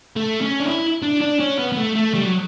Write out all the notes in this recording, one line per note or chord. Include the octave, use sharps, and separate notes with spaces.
A3
C#4
D4
E4
D4
D4
C#4
B3
B3
A3
A3
G3
F#3